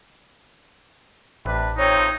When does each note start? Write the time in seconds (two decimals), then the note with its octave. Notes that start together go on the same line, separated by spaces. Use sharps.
1.46 A1 C3 D4 B4
1.78 F2 C3 C4 D#4 C#5